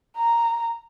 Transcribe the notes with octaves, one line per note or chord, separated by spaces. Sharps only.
A#5